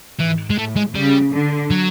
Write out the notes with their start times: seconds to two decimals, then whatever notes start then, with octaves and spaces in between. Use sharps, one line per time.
0.20 G#2 E3
0.50 G#3
0.57 A2 A3
0.76 G#3
0.95 C#3 G3
1.33 D3
1.71 F#3